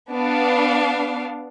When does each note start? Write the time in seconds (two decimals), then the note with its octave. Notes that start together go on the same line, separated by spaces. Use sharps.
0.11 B3 D4 F5